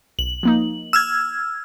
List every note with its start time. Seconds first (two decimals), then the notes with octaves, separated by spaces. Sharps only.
0.19 B1 F#7
0.43 F3 A#3 D#4
0.93 E6 F6 G#6